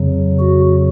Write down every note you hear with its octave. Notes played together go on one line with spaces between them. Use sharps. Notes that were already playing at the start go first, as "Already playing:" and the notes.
Already playing: F2 C#3 F#3
F#4